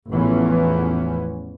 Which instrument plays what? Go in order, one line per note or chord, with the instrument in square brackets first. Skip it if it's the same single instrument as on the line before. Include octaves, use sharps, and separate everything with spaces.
[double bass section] A1 E2 E3 F3 B3 C#4